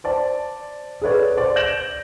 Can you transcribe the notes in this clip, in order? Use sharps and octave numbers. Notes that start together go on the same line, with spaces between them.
C5 D5 A5
G#4 A4 B4 C#5 D5
C5 D5
G6 A#6 D7 E7 F#7